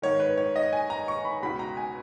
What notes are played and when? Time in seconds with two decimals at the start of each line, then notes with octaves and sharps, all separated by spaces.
0.02 G#2 D#3 C#5
0.20 B4
0.38 C#5
0.56 D#5
0.73 G#5
0.90 A#5
1.08 C#6
1.25 B5
1.43 C#2 B2 B5
1.59 A#5
1.77 G#5